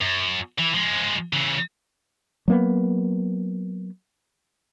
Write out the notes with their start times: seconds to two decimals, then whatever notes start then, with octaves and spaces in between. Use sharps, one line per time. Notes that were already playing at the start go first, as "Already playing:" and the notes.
0.01 F#2
0.58 E3
0.74 F3 G#3
1.33 C#3 E3
2.48 F#3 A#3 B3